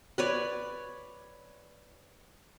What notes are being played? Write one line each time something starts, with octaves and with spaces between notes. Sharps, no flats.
B4 C#5 D5